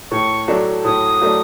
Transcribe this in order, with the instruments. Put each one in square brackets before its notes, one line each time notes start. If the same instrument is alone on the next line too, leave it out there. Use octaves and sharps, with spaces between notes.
[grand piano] A2 [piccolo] C#6
[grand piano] F#3 A3 D4
[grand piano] A2 [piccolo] D#6
[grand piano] F#3 A3 D4